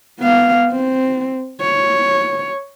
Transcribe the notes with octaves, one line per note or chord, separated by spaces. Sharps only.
B3 F5
C4
C#5